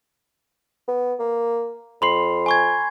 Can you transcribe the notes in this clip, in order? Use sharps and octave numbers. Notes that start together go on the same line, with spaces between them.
B3
A#3
F2 B5 C6 C7
G#5 C#6 G#6